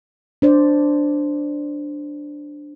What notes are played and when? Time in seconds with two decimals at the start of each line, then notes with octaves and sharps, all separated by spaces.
0.42 D4 C5 D5